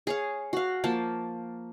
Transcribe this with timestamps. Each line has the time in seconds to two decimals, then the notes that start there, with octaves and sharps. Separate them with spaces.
0.07 G#4 C#5 F5
0.53 F#4 F5
0.84 F3 A#3 A5